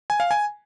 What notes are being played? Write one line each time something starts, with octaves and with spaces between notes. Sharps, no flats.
G#5
F5
G#5